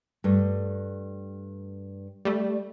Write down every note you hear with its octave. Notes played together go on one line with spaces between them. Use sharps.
G2 A3
G3 A3